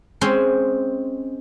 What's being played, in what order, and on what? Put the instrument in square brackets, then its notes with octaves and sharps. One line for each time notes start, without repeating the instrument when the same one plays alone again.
[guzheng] G#3 C4 C#4 C5